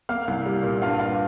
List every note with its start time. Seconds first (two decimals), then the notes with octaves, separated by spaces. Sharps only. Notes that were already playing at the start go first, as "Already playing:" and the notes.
0.09 A#3 F5 F6
0.28 C2
0.46 G3
0.63 A#2
0.82 G2 F4 F5
0.99 G2 F4 F5